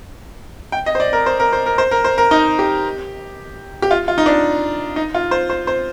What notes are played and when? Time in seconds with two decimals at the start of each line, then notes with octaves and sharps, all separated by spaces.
0.72 G5
0.86 D#5
0.95 C5
1.00 D5
1.13 A#4
1.26 C5
1.40 A#4
1.53 C5
1.66 A#4
1.78 C5
1.91 A#4
2.04 C5
2.18 A#4
2.31 D#4
2.59 G4
3.82 G4
3.91 F4
4.08 F4
4.18 D#4
4.26 D4
4.96 D#4
5.15 F4
5.31 C5
5.50 C5
5.67 C5